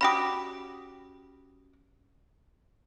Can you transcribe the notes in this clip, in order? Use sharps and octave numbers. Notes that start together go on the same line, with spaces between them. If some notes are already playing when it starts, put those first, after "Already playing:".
C#4 F#4 G4 B5 D#6